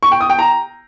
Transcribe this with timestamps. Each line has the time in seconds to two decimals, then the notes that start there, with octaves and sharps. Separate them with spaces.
0.03 C#6
0.12 G5
0.21 D#6
0.30 G5
0.39 A#5